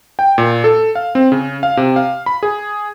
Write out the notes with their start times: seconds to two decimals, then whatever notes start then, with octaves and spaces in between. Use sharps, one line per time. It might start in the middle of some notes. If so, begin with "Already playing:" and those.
0.19 G5
0.38 A#2
0.64 A4
0.95 F5
1.15 C4
1.32 C#3
1.63 F5
1.77 C3
1.96 F5
2.26 B5
2.43 G#4